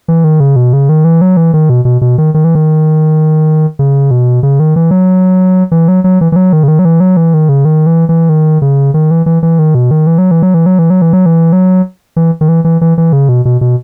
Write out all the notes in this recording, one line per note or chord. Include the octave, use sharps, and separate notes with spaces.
E3
D#3
C#3
B2
C#3
D#3
E3
F#3
E3
D#3
B2
B2
B2
D#3
D#3
E3
D#3
C#3
B2
C#3
D#3
E3
F#3
E3
F#3
F#3
E3
E3
F#3
D#3
C#3
D#3
F#3
E3
F#3
E3
D#3
C#3
D#3
E3
E3
D#3
C#3
D#3
E3
E3
E3
D#3
B2
D#3
E3
F#3
E3
F#3
E3
F#3
E3
F#3
E3
F#3
E3
F#3
E3
D#3
E3
E3
E3
E3
C#3
B2
B2
B2